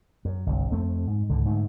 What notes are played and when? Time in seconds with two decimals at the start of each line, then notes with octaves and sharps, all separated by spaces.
0.25 F#2
0.46 G1 C2
0.72 F2 A3 C4
1.07 G#2
1.30 C#2 G#2 D3
1.45 G#2 D3 A3